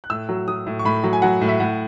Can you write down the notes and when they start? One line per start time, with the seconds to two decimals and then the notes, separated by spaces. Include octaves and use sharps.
0.04 F#6
0.10 A2 E6
0.29 F#3
0.48 F#3 D#6
0.67 A2
0.79 C#6
0.85 A2 B5
1.04 F#3
1.13 G#5
1.22 F#3 F#5
1.41 A2
1.48 E5
1.60 A2 F#5